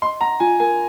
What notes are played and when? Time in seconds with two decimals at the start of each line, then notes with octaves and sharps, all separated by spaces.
0.02 D#5 C6
0.21 F#5 A#5
0.40 F4 G#5
0.60 A#4 G#5